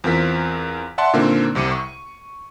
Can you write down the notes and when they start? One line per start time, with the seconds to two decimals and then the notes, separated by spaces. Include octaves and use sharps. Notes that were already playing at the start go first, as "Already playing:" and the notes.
0.04 E2 C4 F4 A#4 B6
0.98 D5 E5 F#5 A5 C6
1.13 A#2 D3 D#3 A#3 C4
1.55 C2 C3 D6 C#7 D#7
1.71 C#6